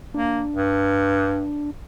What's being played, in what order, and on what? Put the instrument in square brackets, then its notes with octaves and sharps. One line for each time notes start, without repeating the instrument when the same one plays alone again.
[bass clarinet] A#3 [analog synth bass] D4
[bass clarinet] G2